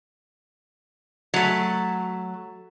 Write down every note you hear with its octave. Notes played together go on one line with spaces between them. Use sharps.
F#3 A3